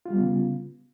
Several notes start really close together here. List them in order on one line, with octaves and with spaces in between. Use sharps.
F4 G3 B3 C#3